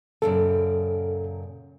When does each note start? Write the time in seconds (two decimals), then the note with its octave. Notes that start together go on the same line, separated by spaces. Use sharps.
0.22 F#2 A#2 C#3 A4